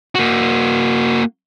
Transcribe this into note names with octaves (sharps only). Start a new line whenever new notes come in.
A#3 F#4